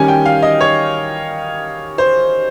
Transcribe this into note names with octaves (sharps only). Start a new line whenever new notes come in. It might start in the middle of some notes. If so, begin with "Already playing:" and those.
Already playing: D#3 G3 C#4 G#5
G5
F5
D#5
C#5
C5